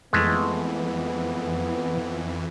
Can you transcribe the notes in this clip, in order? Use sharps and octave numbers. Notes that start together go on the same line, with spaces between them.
F2 E3 G#3 A3 B3